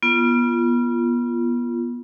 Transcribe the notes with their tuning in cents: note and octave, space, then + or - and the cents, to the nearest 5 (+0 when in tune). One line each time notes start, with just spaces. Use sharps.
B3 -30 F4 -25